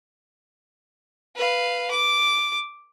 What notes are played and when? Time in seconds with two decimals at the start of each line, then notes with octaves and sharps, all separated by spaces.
1.36 B4 F5
1.91 D6